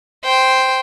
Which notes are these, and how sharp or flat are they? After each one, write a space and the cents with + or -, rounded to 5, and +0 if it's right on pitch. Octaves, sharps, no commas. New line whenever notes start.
C5 +0 G5 +0